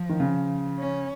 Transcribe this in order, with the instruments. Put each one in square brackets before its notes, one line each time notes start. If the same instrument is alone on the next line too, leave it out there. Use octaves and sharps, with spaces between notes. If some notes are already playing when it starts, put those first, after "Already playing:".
Already playing: [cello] F3
[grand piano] D#3
C#3
[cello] C#4